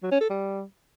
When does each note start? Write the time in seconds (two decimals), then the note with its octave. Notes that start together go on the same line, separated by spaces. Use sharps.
0.03 F#3
0.12 C#4
0.21 A4
0.30 G3